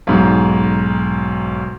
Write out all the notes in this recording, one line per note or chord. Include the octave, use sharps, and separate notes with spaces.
B1 G#2